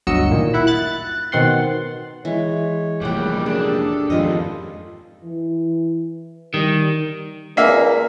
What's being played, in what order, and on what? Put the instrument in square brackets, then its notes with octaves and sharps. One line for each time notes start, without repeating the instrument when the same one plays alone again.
[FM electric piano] G1 D2 F#3 D#5 E6 C#7
A#2 D#3
E4 F#5 B5
F#6 A6
B2 D#3 C4 F#5 C6
[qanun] E3 [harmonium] G#3 C#5
[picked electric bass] F1 A#2 [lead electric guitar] G3 G#4 [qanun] F#5 G5
[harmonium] F#3 A#3 [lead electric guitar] D4 D5 [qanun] G#4
[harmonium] D4 G4 [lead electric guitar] A4
[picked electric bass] F2 G#2 D#3 [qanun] F4 B4 D#5
[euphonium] E3
[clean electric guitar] D#3 [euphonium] G3
[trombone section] C#2 A#2 [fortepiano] A#3 E5 F5